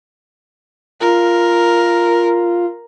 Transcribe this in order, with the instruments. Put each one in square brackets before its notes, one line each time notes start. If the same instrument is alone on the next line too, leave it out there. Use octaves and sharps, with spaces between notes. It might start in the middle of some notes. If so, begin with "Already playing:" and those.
[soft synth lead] F4 [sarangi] A#4